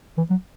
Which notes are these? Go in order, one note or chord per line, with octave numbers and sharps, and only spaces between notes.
E3
F#3